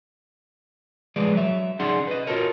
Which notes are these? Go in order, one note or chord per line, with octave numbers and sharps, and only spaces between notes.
F3 G#3 G#4 B4 D5
F#3 E5
C#4 D#4 G#4 D5 F#5 C6
B4 D#5
F4 F#4 A4 A#4 C#5